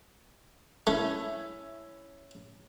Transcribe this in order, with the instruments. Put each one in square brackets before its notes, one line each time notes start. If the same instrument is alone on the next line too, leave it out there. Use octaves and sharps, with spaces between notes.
[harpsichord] A3 [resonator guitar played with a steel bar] C#4 E4